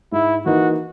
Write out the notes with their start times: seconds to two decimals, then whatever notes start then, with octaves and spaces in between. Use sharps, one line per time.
0.12 G#2 E4
0.46 E3 A#3 D#4 F#4